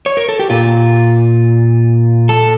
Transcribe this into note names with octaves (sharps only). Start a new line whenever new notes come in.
C#5
A#4
A4
G4
A#2 F4
A4